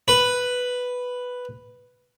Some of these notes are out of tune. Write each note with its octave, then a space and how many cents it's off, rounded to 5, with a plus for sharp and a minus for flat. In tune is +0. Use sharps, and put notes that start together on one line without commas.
B4 +0